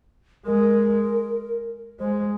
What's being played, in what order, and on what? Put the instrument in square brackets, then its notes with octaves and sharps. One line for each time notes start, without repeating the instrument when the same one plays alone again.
[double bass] G#3 [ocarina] A#4
[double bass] G#3 [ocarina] C5